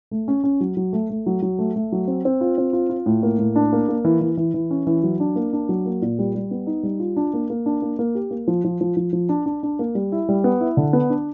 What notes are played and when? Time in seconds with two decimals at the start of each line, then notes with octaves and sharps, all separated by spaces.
0.11 A3
0.28 C#4
0.44 C#4
0.61 F#3
0.77 F#3
0.93 A3
1.10 A3
1.26 F#3
1.42 F#3
1.59 A3
1.76 A3
1.92 F#3
2.08 C4
2.25 C4
2.41 F4
2.58 C4
2.73 F4
2.90 F4
3.06 A2
3.23 A#3
3.39 A2
3.56 D4
3.73 A#3
3.89 A#3
4.05 E3
4.21 E3
4.37 E3
4.54 E3
4.71 C#4
4.87 E3
5.03 F#3
5.20 D4
5.36 A#3
5.53 D4
5.69 F#3
5.86 A#3
6.02 A#2
6.19 G3
6.35 G3
6.51 B3
6.67 D#4
6.83 G3
7.00 F4
7.16 D4
7.34 A#3
7.50 A#3
7.66 D4
7.82 A#3
7.99 A#3
8.15 G4
8.31 A#3
8.48 F3
8.64 F3
8.81 F3
8.97 F3
9.13 F3
9.29 D4
9.46 D4
9.63 D4
9.79 A#3
9.95 G3
10.12 E4
10.29 G3
10.44 B3
10.61 E4
10.77 D3
10.93 B3
11.10 D4